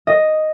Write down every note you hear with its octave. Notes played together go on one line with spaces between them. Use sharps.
D#5